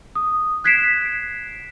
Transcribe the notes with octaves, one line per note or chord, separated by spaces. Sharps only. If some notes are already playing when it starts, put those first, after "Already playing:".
D#6
F#6 G#6 B6 C7 D7 E7